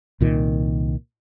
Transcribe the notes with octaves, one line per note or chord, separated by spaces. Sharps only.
C2 A#2 D#3